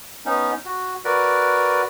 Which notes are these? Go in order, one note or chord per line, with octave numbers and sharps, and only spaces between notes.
B3 C#4 D#4
F#4
F#4 A#4 B4 D5